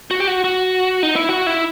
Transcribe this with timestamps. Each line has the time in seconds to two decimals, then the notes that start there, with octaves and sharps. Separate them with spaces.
0.11 F#4
0.20 G4
0.27 F#4
0.44 F#4
1.03 D#4
1.16 E4
1.29 F#4
1.47 E4